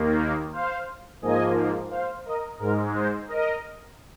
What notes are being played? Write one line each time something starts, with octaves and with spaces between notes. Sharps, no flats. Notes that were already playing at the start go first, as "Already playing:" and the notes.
Already playing: D#2 D#3 A#3
C5 F5
G#2 F3 A#3 D#5 G#5
C5 F5
A#4 D#5
G#2 G#3 A#4
C5
A#4 D#5